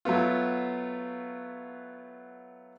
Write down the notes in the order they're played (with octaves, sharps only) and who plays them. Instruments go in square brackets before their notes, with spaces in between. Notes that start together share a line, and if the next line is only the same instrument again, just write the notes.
[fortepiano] F#3 A3 B3 F4